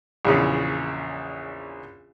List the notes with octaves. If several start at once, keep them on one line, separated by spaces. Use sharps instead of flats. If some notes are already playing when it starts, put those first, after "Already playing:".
A#1 E2 C#3